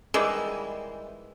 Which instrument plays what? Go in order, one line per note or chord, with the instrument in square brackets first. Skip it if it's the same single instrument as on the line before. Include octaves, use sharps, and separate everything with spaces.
[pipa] D#3 E3 G3 G#3